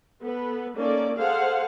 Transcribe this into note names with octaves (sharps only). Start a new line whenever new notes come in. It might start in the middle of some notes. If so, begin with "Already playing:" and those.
B3 A4 B4
A#3 C#4 D#4 A4 D5
G#4 A4 C5 F5 F#5